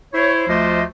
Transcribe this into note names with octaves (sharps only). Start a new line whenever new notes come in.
E4 C5 C#5
D2 F3 A3 F4 C5 D#5